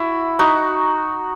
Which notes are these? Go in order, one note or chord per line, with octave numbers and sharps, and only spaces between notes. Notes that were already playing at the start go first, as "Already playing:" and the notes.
Already playing: E4 F#4
D#4 F#4